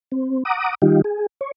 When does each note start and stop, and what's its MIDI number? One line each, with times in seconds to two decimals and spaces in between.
0.12 0.43 60
0.45 0.74 78
0.45 0.74 82
0.45 0.74 86
0.45 0.74 87
0.82 1.01 51
0.82 1.01 55
0.82 1.01 63
0.82 1.01 65
0.82 1.01 67
1.04 1.26 68
1.41 1.51 73